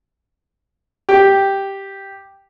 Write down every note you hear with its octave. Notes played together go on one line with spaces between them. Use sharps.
G4